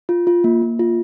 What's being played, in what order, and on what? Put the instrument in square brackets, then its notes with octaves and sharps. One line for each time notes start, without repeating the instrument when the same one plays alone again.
[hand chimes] F4
F4
A#3
A#3
F4